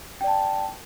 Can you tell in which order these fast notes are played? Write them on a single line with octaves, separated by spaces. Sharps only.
G5 D5 A5